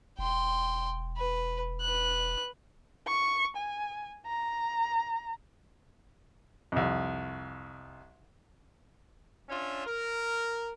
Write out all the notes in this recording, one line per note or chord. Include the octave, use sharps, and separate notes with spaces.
E1 G5 C6
B4
B4 F#6
C#6
G#5
A#5
C2 F2
C#4 D4 F4 C#5 E5
A#4